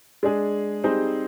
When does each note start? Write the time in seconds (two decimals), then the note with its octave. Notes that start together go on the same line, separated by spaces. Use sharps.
0.23 G#3 D4 G#4
0.84 G3 C4 D#4 G#4 C5